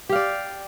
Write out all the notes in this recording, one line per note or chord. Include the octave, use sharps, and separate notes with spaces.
G4 D5 F5